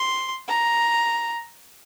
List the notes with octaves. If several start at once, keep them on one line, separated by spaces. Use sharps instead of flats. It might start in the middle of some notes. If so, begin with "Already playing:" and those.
Already playing: C6
A#5